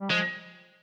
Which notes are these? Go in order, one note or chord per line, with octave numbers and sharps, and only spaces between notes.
G3
F3 G#3